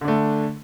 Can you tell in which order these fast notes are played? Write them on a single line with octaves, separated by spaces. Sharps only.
D3 D4 A3